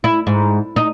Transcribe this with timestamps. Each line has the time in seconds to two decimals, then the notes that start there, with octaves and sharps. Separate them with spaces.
0.04 E4
0.27 G#2
0.76 D#4